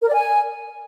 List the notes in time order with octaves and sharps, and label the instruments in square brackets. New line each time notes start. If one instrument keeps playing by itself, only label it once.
[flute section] A#4
D5
G#5